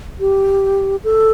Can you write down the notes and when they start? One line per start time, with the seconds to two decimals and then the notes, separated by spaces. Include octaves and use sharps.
0.20 G4
1.04 A4